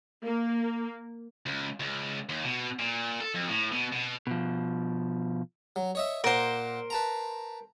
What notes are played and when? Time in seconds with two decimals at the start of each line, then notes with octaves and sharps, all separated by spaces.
0.24 A#3
1.46 C#2
1.80 C#2
2.29 D#2
2.44 B2
2.79 A#2
3.21 A4
3.35 F2
3.48 A2
3.72 B2
3.93 B2
4.27 B2 F3
5.76 F#3
5.95 C#5 D#5 E5
6.24 A#2 A#4 C5 F#5 D6
6.90 B4 A5 A#5